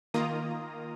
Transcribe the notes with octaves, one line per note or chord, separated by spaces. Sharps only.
D#3 A#3 F4 A#5 D#6